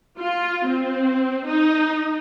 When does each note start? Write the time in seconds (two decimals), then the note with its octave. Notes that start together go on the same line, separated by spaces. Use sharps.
0.19 F4
0.66 C4
1.46 D#4